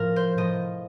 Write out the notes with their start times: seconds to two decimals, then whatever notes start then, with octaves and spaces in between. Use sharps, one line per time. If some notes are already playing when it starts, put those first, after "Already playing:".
Already playing: A2 F3 A#4
0.16 C5
0.38 A2 F3 D#5